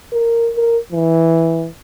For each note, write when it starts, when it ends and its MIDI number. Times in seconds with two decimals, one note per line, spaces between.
0.13 0.51 70
0.56 0.78 70
0.92 1.68 52